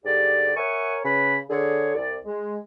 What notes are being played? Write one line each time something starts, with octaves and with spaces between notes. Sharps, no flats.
G#2 D3 G3 G4 D5
A#4 C#5 E5 F#5 G#5 C#6
C#3 B4 B5
D3 G#4 C#5
C2 D5
G#3